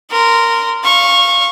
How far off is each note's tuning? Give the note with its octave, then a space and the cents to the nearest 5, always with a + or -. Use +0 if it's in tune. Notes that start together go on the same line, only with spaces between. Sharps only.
A#4 -10 C6 -20
F5 +0 C#6 -20